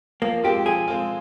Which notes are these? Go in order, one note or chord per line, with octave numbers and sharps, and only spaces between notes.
F3 A#3
G#3 C4 F4 G4
F3 G#4
G#3 C4 F4